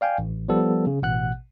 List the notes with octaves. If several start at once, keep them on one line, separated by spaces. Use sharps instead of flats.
D5 F5 G5 G#5
A1
F3 G3 B3 A4
C#3
A1 B2 F#5 F#6